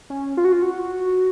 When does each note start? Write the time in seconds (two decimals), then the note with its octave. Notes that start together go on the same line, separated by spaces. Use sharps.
0.10 C#4
0.37 F4
0.45 F#4
0.52 F4
0.62 F#4